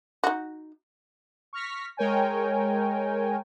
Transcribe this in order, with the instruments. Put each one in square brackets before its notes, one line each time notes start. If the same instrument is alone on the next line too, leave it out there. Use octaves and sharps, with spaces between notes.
[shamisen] D#4 F#4
[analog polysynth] C#6 F6 A#6 B6
G#3 A#4 C#5 G5 G#5